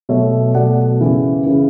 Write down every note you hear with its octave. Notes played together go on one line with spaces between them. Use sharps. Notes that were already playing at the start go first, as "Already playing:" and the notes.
B2 F#3 A3 C#5 E5
B2 F#3 A3 D5 F#5
F#2 C#3 E3
C#3 E3